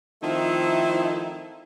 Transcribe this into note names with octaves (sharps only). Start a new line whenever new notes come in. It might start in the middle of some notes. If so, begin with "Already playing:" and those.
D#3 F3 A3 C4 D#4 E4